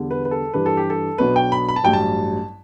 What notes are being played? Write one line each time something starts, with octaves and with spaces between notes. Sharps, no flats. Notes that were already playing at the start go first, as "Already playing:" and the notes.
Already playing: E2 D3 G3
B4
B4
A4
G2 E3 G3 D4 B4
A4
G4
A4
B1 B2 F#3 B3 D4 B4
G5
B5
B5
A5
A1 G2 F#3 G5
A5